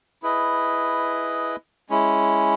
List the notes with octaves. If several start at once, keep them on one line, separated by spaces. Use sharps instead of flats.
E4 G#4 B4 D#5
G#3 C#4 E4